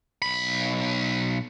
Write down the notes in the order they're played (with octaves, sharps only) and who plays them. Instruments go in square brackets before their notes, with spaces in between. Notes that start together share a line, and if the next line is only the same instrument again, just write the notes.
[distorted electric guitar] B1 B5